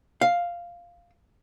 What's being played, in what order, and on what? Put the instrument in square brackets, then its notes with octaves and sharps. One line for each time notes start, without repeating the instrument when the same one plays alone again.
[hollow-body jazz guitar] F5